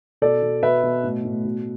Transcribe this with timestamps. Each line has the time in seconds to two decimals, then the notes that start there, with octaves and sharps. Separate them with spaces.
0.22 B2 A4 D5
0.42 B2
0.63 B2 B4 E5
0.83 B2
1.03 A2
1.24 A2
1.45 B2